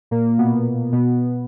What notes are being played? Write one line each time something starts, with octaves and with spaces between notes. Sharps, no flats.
A#2 A#3
B2 B3
B2 B3